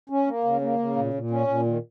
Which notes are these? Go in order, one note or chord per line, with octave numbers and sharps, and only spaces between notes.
C#4
A#3
C#3
A#3
C#3
A#2
A#2
C#4
A#2
D#3